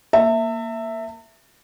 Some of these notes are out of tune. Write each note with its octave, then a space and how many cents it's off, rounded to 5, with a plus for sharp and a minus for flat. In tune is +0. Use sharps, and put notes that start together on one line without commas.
A#3 +0 E5 +0 A5 +45